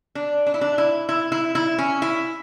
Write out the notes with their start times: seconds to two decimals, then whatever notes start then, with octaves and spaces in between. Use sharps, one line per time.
0.15 D4
0.46 D4
0.54 E4
0.61 D4
0.78 E4
1.09 E4
1.32 E4
1.55 E4
1.78 C#4
2.02 E4